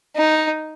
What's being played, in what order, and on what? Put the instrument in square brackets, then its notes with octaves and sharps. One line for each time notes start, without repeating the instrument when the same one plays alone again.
[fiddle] D#4